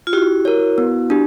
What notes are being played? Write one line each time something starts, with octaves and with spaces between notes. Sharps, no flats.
F4
E4 F#4 G4
A#4 C#5
B3
D4 G4